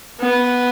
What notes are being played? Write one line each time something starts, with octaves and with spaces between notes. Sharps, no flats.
B3